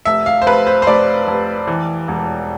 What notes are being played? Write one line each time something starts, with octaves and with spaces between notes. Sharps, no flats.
F1 E5
F5
C5
F1 B4
C5
C5
F1 D5
F1
E3
E1